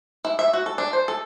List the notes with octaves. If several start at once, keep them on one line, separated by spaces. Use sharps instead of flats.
E4
E5
F#4
A4
D4
C5
A4